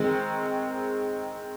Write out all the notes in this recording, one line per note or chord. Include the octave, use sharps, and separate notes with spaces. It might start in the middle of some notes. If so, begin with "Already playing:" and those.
Already playing: D#3 G#3 C4